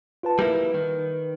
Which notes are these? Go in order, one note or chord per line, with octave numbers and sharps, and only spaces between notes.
F4 B4 A5
G3 A#3 E4 B4
D#3